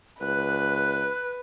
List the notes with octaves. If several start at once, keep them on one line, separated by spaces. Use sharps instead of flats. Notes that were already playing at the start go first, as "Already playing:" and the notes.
C#2 B4 F#6